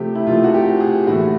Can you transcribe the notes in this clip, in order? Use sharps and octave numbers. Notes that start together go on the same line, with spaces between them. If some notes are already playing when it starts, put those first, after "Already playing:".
Already playing: C3 F3 A3 G4
E4
C3 F3 A3 F4
F#4
G4
G#4
A2 E3 A3 F#4